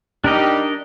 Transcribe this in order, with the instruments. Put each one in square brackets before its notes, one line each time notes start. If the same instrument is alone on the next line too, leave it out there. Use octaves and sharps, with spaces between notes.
[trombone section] G3 D#4 G4 [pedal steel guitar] D4 A#4 D#5